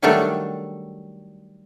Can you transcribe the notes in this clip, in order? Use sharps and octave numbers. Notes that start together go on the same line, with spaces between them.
D#3 F#3 G3 A3 D4 A4